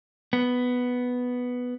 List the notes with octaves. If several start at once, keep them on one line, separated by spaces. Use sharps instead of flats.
B3